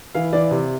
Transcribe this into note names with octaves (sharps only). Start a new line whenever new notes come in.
E3 F5
E3 D5
C3